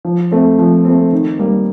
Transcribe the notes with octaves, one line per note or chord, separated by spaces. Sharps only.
F3
A3 C4
F3
A3 C4
D#3
G3 A#3